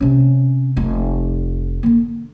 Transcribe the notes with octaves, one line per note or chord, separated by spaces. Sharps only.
C3 C#4
F1 F4
D3 A#3